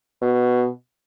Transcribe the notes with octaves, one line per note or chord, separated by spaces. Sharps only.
B2